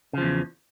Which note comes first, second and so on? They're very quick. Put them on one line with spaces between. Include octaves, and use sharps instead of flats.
C#3 F3 E2